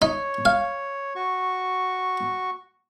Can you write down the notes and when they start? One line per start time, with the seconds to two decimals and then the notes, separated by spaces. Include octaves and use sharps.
0.02 D#4 C#5
0.45 F5
1.15 F#4 C#6